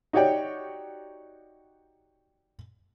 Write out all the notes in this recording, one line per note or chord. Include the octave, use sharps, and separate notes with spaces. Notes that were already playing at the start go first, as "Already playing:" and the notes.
D#4 F#4 G4 C#5 D5 G5